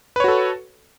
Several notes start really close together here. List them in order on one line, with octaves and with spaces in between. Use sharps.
B4 C#5 F#4 A4